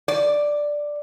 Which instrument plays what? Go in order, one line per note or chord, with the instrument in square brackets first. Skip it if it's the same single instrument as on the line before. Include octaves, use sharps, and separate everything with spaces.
[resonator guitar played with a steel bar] D5